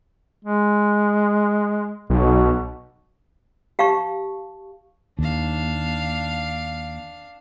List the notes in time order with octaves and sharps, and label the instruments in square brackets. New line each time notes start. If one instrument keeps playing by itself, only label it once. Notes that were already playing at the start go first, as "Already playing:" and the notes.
[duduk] G#3
[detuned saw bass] B1 [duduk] B2
[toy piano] G4 F5 A5 C#6
[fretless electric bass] D#2 [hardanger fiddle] D4 F5